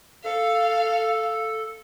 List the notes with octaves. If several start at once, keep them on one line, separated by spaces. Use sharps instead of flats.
A4 F5